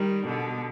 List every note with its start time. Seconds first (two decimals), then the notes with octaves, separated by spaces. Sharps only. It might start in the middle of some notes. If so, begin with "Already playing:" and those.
Already playing: D#3 G3
0.25 B2 D3